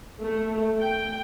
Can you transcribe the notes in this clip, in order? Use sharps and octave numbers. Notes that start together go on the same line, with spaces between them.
A3
G5